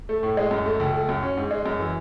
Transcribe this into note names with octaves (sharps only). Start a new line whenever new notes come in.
A3
A2
G#3
F#2
A3
C#2
A3
F#2
C#4
G#2
G#3
F#2
E3